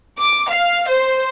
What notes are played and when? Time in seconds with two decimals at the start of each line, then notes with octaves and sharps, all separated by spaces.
0.20 D6
0.50 F5
0.89 C5